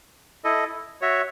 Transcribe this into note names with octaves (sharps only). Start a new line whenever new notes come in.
E4 A4 D#5
F#4 C#5 E5